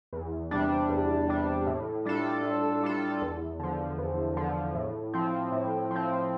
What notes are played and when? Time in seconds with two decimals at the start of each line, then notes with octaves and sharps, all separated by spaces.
0.13 E2
0.51 C3 G3 D4
0.90 E2
1.28 C3 G3 D4
1.67 A2
2.05 G3 D4 F4 A4
2.43 A2
2.83 G3 D4 F4 A4
3.22 E2
3.60 D3 F3
3.98 E2
4.37 D3 F3
4.75 A2
5.14 F3 C4
5.52 A2
5.91 F3 C4